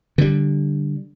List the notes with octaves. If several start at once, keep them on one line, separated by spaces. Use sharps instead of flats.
D3 G3